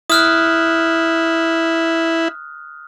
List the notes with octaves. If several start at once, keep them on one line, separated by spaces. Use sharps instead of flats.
E4 D#6 F6 F#6